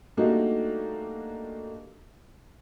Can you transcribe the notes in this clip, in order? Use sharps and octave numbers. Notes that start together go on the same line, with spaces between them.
G3 A3 A#3 D4 D#4 F#4